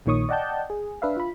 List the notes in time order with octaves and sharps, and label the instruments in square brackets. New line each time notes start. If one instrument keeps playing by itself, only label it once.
[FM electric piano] A#1 A#2 D#3 C#5 C#6 D#6
D5 D#5 F#5 G5 A5 G6
G#4
D4 B4 E5 F5
F4 B5